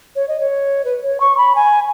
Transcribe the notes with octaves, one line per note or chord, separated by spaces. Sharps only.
C#5
D#5
C#5
B4
C#5
C#6
B5
G#5